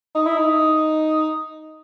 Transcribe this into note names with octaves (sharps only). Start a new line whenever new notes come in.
D#4
E4
D#4